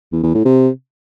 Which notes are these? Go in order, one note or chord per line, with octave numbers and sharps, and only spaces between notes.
E2
E2
A2
C3